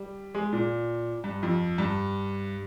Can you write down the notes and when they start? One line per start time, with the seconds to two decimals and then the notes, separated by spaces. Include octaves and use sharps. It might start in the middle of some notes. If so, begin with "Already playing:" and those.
Already playing: G3
0.35 G#3
0.53 A#2
1.24 G2
1.43 F2
1.78 G2